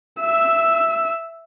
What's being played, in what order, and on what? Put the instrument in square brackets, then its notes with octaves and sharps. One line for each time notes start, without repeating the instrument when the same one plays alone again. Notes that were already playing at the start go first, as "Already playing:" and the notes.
[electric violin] E5 E6